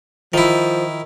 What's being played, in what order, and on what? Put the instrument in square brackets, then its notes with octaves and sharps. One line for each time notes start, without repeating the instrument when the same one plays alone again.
[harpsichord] D#3 E4 [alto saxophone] F3